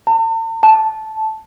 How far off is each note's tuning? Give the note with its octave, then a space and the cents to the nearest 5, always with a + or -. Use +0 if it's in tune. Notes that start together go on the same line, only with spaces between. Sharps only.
A5 +45
A5 -10